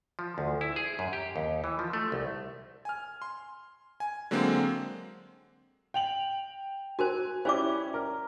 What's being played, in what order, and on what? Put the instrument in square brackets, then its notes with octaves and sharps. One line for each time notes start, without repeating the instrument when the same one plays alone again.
[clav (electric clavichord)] F3
D2
E4
G#4
F#2
G4
D#2
E3
F3
A3
C2
[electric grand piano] G#5 F6
C6
G#5
D3 F#3 G#3 A#3 C4
[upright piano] G5 F7 F#7
[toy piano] F#4 A#4 C5 [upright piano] G#5
[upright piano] C#4 E4 G4 [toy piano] C5 D5 D6
[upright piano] A#4